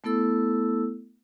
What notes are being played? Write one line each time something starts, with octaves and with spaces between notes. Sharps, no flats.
A3 B3 E4 A4 E6